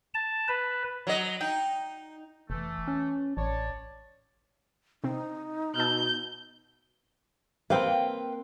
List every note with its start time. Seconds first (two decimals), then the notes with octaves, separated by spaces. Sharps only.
0.15 A5
0.48 B4
1.07 F#3 D#5
1.41 D#4 G5
2.50 F1 E3 A3
2.88 C#4
3.37 A1 C#5 D5 A5
5.04 C3 C4 D#4
5.76 B2 A5 E6 F6 G6
7.70 A#3 C4 B4 F5 G5